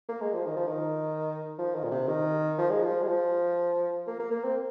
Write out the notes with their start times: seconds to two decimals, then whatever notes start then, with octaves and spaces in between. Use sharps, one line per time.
0.09 A#3
0.21 G#3
0.34 F3
0.46 D#3
0.56 F3
0.68 D#3
1.58 F3
1.75 D#3
1.84 A#2
1.91 C3
2.08 D#3
2.58 F3
2.70 G#3
2.83 F3
3.03 G#3
3.07 F3
4.07 A#3
4.19 A#3
4.31 A#3
4.44 C4